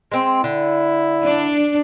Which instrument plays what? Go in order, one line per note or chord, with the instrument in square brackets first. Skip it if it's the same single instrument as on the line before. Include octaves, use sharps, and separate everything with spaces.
[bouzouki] G#3 C4
[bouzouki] D3 [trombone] E4
[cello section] D4